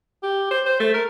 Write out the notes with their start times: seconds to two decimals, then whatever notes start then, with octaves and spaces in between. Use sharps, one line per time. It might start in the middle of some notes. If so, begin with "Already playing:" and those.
0.23 G4
0.51 C5
0.66 C5
0.80 A3
0.94 A#4